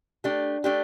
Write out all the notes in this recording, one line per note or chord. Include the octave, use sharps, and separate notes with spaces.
A3 D4 G4
A3 D4 G4